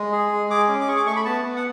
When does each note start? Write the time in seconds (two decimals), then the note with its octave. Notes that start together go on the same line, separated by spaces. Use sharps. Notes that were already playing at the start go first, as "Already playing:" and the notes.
Already playing: G#3
0.12 G#4
0.32 G#3
0.50 G#4 D6
0.68 C#4
0.81 D6
0.88 G#4 C#6
0.97 D6
1.06 A3 C#6
1.16 B5
1.25 B3 A5
1.44 B3
1.56 F#5